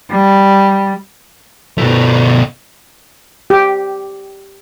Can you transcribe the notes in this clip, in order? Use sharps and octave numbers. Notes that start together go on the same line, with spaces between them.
G3
B2 A3
G4